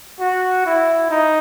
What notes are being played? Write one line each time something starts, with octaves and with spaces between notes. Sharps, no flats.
F#4
E4
D#4